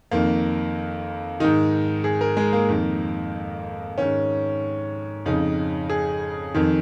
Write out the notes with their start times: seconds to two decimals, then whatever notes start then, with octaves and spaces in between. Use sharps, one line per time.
0.11 F2 D#3 A#3
1.40 G#2 D#3 D#4
2.04 G#4
2.21 A#4
2.37 G#3
2.53 A#3
2.69 F2 D#3
3.98 G#2 D#3 C#4
5.25 F2 C#3 D#4
5.90 G#4
6.54 F2 D#3